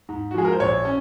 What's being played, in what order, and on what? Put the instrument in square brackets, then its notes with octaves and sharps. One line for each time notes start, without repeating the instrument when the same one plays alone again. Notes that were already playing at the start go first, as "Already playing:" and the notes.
[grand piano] G#2
F#4
F3 G#3 G#4
A#4
C5
A#1 C#5
C#4